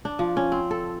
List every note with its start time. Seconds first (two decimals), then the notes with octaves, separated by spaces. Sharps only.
0.05 D4
0.19 F3
0.37 C#4
0.52 C4
0.71 A4